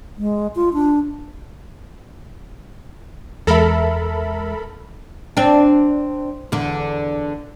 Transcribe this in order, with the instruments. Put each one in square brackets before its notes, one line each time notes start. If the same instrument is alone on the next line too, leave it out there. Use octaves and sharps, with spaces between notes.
[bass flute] G#3
F4
D4
[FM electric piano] E2 G#3 E5 [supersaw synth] A4 A#4 B5
[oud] C4 D4
E2 D3